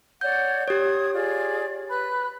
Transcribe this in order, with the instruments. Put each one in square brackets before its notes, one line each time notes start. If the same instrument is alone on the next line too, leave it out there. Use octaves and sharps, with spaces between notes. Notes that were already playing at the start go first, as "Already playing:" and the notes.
[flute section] C#5 D5 F#5 [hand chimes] G6
[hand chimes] G4 C#5 [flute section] D#6 G#6
[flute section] F4 G#4 D5
B4 B5 F#6